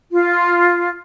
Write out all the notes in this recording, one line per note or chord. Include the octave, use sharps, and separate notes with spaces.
F4